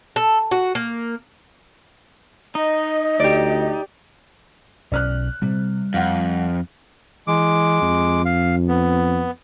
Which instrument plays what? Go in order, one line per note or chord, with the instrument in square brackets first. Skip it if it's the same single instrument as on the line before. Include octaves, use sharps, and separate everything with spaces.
[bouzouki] A4
F#4
A#3
[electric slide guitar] D#4 [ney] D#5
[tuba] D2 [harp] G4 D5
[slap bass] B1 C#4 [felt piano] D5 F6 F#6
[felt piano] C3 [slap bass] G3
[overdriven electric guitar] F2 [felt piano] F5 F#5
[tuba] E3 [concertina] G#3 D6
[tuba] F2
[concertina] F5
B3